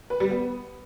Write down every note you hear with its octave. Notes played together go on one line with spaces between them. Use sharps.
B4
G3
B3